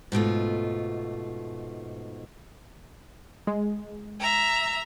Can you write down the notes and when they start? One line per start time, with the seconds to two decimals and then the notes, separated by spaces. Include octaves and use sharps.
0.12 G#2 B2 A3 F4
3.47 G#3
4.20 E5 A#5